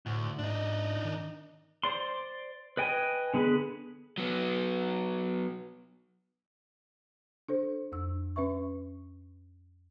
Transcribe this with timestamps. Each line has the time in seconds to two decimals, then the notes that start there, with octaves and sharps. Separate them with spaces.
0.06 D2 A2
0.39 G#2 D4 D#4
1.04 D#3
1.83 C5 D5 C6
2.77 B4 D#5 G5 G#5
3.34 D3 B3 G#4 B4
4.18 F#3 B3
7.48 D4 A4 C5
7.92 F2 D4 E6
8.36 C#4 B4 E5 C#6